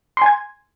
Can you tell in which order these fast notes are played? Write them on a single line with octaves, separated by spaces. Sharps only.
C6 G#5 G#6